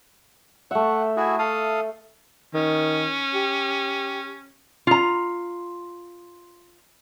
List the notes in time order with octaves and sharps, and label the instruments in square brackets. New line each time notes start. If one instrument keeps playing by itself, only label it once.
[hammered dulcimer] A3 E5 [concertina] F#5
[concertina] E4 F#4 G#4
A4 F5 D#6
[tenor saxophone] D#3 [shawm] C#4
[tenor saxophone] G4
[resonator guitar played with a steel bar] F4 A#5